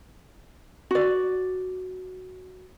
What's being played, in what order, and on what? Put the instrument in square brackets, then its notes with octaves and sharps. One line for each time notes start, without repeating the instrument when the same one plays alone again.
[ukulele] F#4 D5